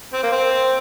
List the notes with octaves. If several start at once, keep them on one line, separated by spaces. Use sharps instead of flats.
C4
A#3
C4